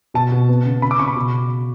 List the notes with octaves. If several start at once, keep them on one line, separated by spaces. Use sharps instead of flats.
B2 A5
B2
B3
C#3
C#3 B5
D6
C#3 C#6
B5
B2